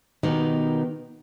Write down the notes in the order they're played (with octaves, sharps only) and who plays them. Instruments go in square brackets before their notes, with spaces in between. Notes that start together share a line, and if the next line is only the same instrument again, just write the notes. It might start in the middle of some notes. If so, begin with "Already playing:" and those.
[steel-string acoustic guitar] B2 D#3 B3 D#4 G4